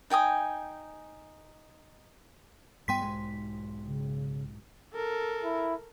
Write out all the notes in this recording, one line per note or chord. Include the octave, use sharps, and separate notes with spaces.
D#4 G5 G#5 D#6
G2 G3 B3 G5 C6 B6
B1 G#2 G#3
C#3
A4 A#4
E4